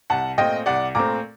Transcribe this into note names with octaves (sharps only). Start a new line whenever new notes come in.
C2 F#5 A5
A#2 A3 C4 D#5 G5
C2 D5 F#5
A#2 A3 C4 A#5 D6